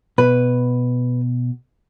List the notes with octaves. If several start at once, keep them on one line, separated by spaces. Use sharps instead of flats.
B2 B4